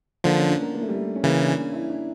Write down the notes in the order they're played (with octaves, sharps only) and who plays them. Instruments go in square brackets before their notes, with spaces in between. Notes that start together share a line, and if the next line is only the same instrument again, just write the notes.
[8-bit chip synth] D3 F3 [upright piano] A#3
[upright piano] C#4
D4
A#3
A#3
A3
G3
A3
C#4
[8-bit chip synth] C#3 E3 [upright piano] A#3
[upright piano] D4
C#4
E4
D4